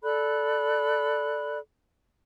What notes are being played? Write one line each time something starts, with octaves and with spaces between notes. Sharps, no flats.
A4 D5 B5 F#6